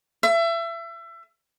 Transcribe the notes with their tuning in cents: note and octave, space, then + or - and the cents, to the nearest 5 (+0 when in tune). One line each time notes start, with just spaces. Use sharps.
E5 +30